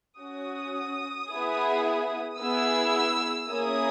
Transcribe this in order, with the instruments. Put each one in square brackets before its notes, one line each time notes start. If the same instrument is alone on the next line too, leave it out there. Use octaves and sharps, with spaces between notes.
[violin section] C#4 F#4 D#6
B3 E4 G#4
B3 E4 G#4 E6
A#3 C#4 E4 G#4 D#6